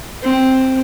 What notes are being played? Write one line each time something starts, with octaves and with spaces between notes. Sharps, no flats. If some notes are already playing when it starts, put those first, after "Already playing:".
C4